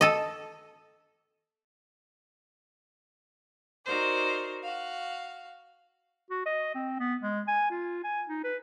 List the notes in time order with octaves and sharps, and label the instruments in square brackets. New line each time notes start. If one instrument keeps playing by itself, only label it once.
[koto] A4 D#5
[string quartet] D#4 F#4 A#4 C5 D5
F#4 F5
[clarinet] F#4
D#5
C4
B3
G#3
G#5
F4
G#5
D#4
B4